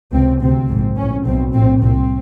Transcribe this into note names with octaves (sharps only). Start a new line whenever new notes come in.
C#2 C3 C4
D2 C3 C4
A#1 G#2
A#1 A2 C#4
B1 B2 C4
A#1 A2 C4
C2 A#2 C4